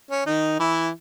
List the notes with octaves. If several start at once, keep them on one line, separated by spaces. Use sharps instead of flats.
C#4
D#3 D#4
E3 E4